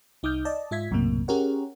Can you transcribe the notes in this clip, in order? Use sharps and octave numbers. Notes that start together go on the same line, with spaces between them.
C2 D#4 D6 D#6 F6 G6
D5 D#5 A5
G#2 F4 E5 G#6 B6
B1 F#2 A2 C3 A#3
C#4 G4 G#4 A#4 C#5 F#5